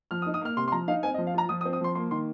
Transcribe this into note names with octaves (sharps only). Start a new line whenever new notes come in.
F3 F6
D#6
D#4
D#6
A#3 F6
C3 C6
C6
F3 A#5
D#4 F5
C4 G#5
D#5
F3
F5
F4 A#5
F3 D#6
D#6
C4
D#6
F3 C6
A#3 C6
D#3 C6